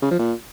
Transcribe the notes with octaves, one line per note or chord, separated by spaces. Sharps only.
C#3
F3
A#2